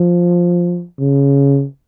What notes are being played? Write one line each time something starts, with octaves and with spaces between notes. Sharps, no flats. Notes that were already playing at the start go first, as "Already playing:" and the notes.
Already playing: F3
C#3